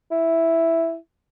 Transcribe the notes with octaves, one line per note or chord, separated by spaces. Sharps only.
E4